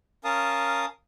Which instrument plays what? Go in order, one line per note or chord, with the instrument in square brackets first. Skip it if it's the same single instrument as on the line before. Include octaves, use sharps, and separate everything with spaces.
[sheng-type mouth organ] C#4 A#4 F5 A5 D#6